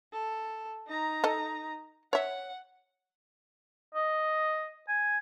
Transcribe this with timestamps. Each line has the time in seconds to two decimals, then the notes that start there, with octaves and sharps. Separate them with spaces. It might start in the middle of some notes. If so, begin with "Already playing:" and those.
0.13 A4
0.88 D#4 A#5
1.24 A4 D#5
2.13 C#5 E5 F#5
3.95 D#5
4.88 G#5